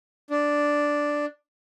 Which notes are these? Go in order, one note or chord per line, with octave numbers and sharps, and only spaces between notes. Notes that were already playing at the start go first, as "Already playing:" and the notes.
D4